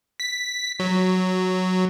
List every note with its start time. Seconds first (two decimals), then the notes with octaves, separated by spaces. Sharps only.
0.20 B6
0.80 F#3